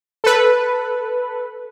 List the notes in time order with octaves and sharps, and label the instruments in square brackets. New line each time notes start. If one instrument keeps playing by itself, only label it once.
[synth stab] A4 B4